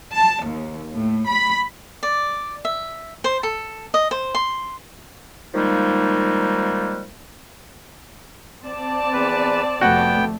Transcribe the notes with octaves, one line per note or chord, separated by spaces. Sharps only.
A5
D#2
A2
B5
D5
E5
C5
A4
D#5
C5
C6
D#3 F3 G3 G#3 A#3 D#4
C4 D5 A5
E2 B4
F1 A3 B3 F#4 F#5 G5